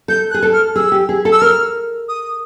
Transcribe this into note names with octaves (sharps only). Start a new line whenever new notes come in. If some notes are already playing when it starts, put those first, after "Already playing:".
A4 G6
F#6
G#4
A4
F6
G#4 E6
G4
G#4
A4
E6
A#4 F6
D#6